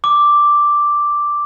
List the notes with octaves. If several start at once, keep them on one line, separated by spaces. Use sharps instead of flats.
D6